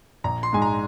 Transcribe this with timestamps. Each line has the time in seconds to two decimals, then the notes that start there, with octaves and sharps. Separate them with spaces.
0.24 A#1 A#5
0.43 C6
0.53 G#2 G#3 G#5
0.62 A#5